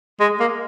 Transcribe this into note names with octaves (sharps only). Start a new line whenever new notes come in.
G#3
A#3